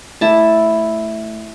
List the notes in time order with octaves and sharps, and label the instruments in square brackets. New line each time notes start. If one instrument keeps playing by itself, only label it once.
[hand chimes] A3 [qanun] E4 A5